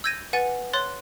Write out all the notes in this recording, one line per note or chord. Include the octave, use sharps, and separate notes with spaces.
E6 G6 G#6 A#6 D#7
B4 F#5 G#5 A6
C#5 C6 F#6 A6